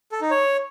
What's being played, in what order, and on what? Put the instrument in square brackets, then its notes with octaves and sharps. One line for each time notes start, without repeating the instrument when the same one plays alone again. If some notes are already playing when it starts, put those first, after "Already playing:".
[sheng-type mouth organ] A4
D#4
C#5